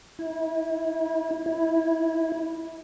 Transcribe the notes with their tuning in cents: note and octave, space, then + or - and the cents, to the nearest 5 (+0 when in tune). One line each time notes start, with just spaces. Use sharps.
E4 -30
E4 -15